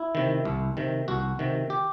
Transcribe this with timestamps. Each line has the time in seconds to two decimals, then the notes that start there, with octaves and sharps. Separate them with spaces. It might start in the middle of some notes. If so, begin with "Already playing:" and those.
Already playing: E4
0.15 C3 D#3
0.45 C2
0.77 C3 D#3
1.08 C2 F#4
1.39 C3 D#3
1.70 G4